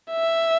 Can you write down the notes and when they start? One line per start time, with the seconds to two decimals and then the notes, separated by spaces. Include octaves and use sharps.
0.11 E5